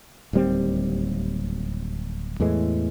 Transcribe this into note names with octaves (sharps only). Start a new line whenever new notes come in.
D1 D#2 G3 C4
E2 A2 E3 G#3